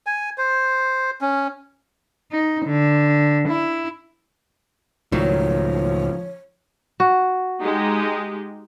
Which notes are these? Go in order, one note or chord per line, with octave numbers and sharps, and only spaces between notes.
G#5
C5
C#4
D#4
D3
E4
C#2 A2 D#3 F3 F#3 C#5
F#4
G#3 D#4 G4